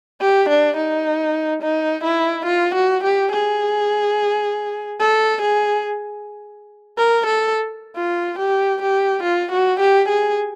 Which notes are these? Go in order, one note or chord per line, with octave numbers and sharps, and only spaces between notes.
G4
D4
D#4
D#4
E4
F4
F#4
G4
G#4
A4
G#4
A#4
A4
F4
G4
G4
F4
F#4
G4
G#4